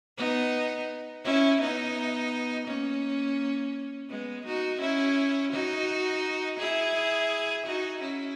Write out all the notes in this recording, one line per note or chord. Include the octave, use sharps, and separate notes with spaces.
B3 D#4
C#4 E4
B3 D#4
A#3 C#4
G#3 B3
D#4 F#4
C#4 E4
D#4 F#4
E4 G#4
D#4 F#4
C#4 E4